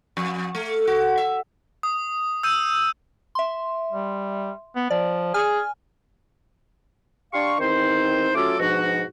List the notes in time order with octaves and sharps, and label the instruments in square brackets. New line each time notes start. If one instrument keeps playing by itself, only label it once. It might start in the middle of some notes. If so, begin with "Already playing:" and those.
[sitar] F2
A3
F#4
E5
[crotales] D#6
E6 G6 D#7
[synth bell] E5 C6
[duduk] G3
B3
[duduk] F3 [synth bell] D5
[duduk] G#4 [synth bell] G#5 F6
[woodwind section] D4 G4 F5 C6 C#6
E2 D#3 C4 D#4 C5
F#3 A3 C#4 F4 A4 D6
G#2 B2 F3 D4 F#4